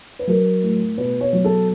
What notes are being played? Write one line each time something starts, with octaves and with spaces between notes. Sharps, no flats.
B4
F#3 A#4
A2
B2 B4
C#5
F#3
A4